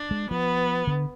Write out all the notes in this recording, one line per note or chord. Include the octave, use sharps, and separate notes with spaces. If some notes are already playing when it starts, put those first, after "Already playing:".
Already playing: D4
G#3
F3 B3
D3